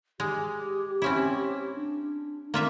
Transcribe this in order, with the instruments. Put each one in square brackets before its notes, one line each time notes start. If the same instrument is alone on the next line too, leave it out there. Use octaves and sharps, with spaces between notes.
[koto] G#3 [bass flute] G4
[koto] C4 C#4 E4
[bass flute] D4
[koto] A#3 F4 E5 [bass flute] C4